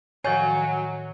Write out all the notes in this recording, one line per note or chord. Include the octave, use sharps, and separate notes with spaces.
A2 D#3 F3 F#3 C#5 G#5